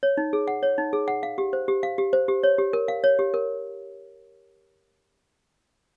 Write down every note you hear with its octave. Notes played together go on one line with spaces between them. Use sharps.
C#5
D#4
G#4
F#5
C#5
D#4
G#4
F#5
F5
G4
C5
G4
F5
G4
C5
G4
C#5
G4
A#4
F5
C#5
G4
A#4